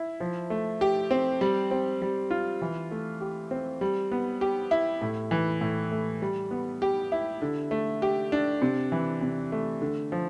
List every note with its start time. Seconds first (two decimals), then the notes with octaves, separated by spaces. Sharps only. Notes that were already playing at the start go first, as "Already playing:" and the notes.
Already playing: E4
0.20 F3
0.50 A3
0.81 G4
1.11 C4
1.41 G3
1.71 C4
2.02 G3
2.31 F4
2.62 E3
2.91 A3
3.21 G4
3.51 C4
3.81 G3
4.12 B3
4.41 G4
4.71 E4
5.02 A2
5.31 E3
5.61 A2
5.92 A3
6.22 G3
6.51 B3
6.82 G4
7.12 E4
7.42 D3
7.71 A3
8.02 G4
8.32 D4
8.62 C3
8.92 E3
9.21 C3
9.52 A3
9.82 D3
10.12 F3